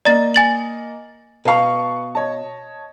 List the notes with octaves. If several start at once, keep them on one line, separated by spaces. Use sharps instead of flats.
A#3 D5 D#5 A#5 A6
G#5 A6 F#7
B2 B4 F5 A5 C#6
C#5 D#5 A5